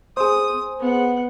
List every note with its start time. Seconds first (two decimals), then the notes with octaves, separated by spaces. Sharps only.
0.17 G#4 C5 D#6
0.79 B3 F#5